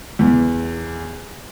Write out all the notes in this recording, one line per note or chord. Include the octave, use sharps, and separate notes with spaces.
E2